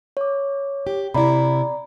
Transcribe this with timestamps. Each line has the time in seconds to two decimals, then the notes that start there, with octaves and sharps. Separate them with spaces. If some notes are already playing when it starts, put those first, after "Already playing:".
0.17 C#5 D6
0.87 G4
1.14 C3 E4 D5 A#5 B5